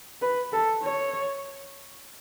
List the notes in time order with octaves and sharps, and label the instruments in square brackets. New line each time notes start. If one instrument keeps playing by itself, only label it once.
[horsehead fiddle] B4
A4
C#5